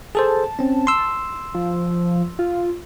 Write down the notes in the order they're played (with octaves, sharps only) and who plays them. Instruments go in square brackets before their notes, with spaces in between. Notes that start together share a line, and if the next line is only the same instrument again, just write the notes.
[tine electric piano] G#4 A4 C5 [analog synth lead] A5
[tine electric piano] C4 C#4
C6 E6
[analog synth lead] F3
F4